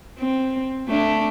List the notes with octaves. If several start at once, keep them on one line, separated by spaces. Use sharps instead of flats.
C4
A3 D4